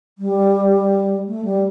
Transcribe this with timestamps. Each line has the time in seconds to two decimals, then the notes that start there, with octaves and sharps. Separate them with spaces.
0.18 G3
1.28 A3
1.45 G3